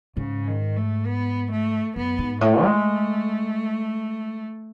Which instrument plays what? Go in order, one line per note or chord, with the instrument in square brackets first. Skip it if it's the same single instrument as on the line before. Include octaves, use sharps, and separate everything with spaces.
[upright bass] G#2 [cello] C#3
[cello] D#3
A3
B3
A3
[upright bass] F#2 [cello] B3
[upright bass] G#2
[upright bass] A2 [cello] A3
[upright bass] G#3